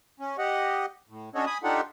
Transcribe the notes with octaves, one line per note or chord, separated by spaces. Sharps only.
C#4
G4 D#5 F#5
A2
C#4 D4 F#4 A4 C#5 D#5
G#5 B5 D#6
D4 D#4 F4 G4 A4 F#5